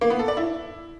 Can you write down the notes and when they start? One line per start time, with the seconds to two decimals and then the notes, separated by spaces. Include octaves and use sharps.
0.01 A#3
0.10 B3
0.19 A4
0.28 D5
0.37 E4